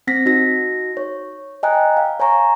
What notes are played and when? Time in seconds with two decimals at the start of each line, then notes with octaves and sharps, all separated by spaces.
0.07 C4 A#6 B6
0.26 D#4 F#4 A#6
0.97 C#5
1.63 D#5 G5 G#5 A#5 F#6
1.97 F5
2.20 C#5 G#5 A#5 C#6